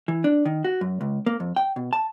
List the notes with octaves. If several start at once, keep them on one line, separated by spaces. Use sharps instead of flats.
E3
D4
D#3
F#4
F#2
C#2
A#3
F2
G5
B2
A5